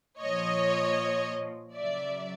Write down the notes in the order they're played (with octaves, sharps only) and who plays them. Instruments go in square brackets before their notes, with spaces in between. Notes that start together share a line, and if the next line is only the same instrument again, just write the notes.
[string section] A#2 F3 C#5 D#5
C#3 F#3 D5 E5